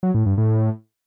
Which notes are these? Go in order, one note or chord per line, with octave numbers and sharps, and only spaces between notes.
F#3
A2
G2
A2